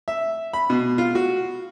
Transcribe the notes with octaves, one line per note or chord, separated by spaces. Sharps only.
E5
B5
B2
F4
F#4